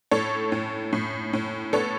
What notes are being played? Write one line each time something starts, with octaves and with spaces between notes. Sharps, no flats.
A2 A4 C#5
A2
A2
A2
B3 A4 C#5